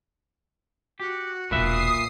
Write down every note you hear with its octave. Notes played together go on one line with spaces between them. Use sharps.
F#4 G4
E1 B1 A#2 B4 E5 D#6 C7